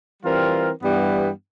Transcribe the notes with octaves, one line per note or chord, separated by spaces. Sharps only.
E3 G3 C4 F4 A#4
G2 E3 G3 B3